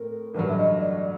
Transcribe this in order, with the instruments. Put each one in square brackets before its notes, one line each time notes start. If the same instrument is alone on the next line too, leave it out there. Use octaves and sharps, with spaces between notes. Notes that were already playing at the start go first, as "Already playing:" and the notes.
Already playing: [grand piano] A2 A3 C4 [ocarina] A#4
[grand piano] A1 G2 D3 F#3 [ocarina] B4
[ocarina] E5
D#5
D5